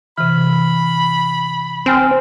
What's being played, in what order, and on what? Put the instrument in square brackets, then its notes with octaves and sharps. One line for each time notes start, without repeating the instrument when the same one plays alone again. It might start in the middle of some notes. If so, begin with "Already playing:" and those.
[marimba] C3 E3 [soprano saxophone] B5 [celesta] F6
[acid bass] C4 [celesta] G5 G#5 F6